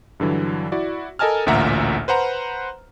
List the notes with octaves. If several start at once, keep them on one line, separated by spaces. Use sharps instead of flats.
G2 D3 E3 F#3
E4 F#4 D5
A4 A#4 D#5 G#5 A5 F6
A1 D2 A#2 E5 F#5 A#5
B4 C5 F#5 A#5